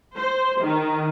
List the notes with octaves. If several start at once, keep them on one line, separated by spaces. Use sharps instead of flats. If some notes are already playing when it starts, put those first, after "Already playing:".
C5
D#3